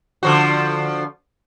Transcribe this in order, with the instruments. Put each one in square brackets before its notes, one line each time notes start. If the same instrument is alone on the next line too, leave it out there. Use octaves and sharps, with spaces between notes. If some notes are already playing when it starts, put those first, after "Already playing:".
[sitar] D3 F3 F#4